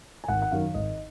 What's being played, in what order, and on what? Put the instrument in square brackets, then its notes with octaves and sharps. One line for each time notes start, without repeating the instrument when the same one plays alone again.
[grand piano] G#5
G#1 F#5
F#5
F#2 D#3 F#3 F5
G#1 D#5